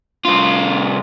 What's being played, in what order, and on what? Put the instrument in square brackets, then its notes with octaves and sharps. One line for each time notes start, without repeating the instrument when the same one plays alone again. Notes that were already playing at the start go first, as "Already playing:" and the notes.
[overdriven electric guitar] C2 F4